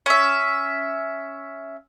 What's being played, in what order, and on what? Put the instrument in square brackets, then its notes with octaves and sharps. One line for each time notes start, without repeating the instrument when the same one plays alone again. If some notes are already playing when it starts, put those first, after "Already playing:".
[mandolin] C#4 E5